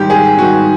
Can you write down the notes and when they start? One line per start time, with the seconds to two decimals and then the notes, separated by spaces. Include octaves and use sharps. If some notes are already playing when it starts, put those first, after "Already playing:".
Already playing: G#2 D#3 G3 G4
0.10 G#4
0.37 G#2 D#3 G3 F#4